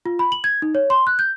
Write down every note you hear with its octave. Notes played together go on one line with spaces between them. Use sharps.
F4
B5
F#7
G#6
D#4
C#5
C6
F#6
G6